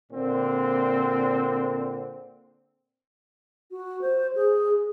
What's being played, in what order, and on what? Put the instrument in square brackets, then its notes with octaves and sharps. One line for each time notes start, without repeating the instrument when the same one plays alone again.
[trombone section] A#2 D3 C4
[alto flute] F#4
C5
G#4